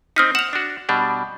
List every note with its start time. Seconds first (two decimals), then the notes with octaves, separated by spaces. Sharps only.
0.16 C4 D#4 D#6 F6 B6
0.35 F#5 E7 F7
0.53 D4 F#4
0.89 B2 G3 D4